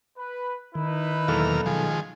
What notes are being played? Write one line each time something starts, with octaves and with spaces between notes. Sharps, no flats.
B4
D#3 D#4 E4 B4
B1 E2 A#3 A4 F5 F6
D#3 F3 G#3